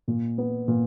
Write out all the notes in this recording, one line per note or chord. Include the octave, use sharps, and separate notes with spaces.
A#2
B3
A#2